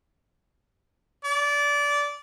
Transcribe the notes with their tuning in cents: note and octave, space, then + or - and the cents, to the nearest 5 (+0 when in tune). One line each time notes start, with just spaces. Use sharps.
D5 -20